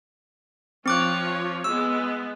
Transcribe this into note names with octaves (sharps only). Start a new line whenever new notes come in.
F3 C4 F4 C#5 D6 F#6
G#3 B3 E6